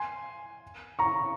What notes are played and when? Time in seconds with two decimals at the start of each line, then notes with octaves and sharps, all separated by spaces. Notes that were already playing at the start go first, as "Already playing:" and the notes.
Already playing: G#5 C6
0.99 A#5 C#6